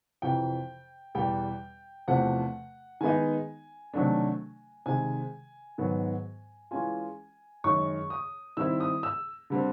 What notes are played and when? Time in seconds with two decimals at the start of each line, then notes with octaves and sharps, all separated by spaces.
0.22 F2 C3 E3 G5
1.15 E2 B2 G3 G5
2.08 E2 C3 F3 A3 F#5
3.01 D#3 G#3 B3 D#4 G#5
3.93 C3 D#3 F#3 A3 D4
4.86 C3 D#3 G#3 G#5
5.78 G#2 D#3 F#3 B3
6.71 E3 G#3 C#4 F4 G#5
7.64 F#2 D#3 G#3 C#6
8.10 D#6
8.57 D#3 G3 C4 E4 E6
8.80 D#6
9.03 E6
9.50 D3 G3 C4